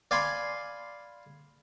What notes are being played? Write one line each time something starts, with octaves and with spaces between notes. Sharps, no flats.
D5 F5 G#5 B5 C6